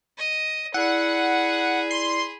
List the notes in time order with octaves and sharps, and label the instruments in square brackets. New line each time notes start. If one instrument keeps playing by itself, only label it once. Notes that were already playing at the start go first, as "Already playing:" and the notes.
[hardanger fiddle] D#5
[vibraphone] E4 D5 [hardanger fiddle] G#4 B5 [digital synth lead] F#5
[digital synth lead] C6